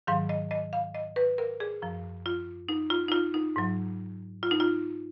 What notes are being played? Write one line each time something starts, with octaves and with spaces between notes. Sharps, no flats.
G#2 D#3 F#3 F5
D#5
D#5
F5
D#5
B4
A#4
G#4
F#2 F3
F4
D#4
F4
D#4
F4
D#4
G#2 F#3
F4
D#4
F4